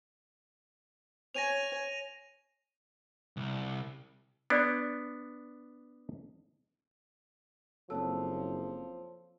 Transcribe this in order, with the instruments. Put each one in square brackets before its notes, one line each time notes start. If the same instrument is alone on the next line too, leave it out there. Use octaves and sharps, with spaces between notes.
[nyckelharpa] C#5 G#5 [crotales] A#6 D#7 F7
[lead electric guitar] C2
[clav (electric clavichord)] B3 D4 [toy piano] D5 E6
[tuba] F#1 [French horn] F3 [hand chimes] A#3 C4 A4 [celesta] C#5 A5 E6